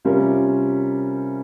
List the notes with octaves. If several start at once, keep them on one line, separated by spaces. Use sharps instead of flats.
C3 G3 C#4 F4 A#4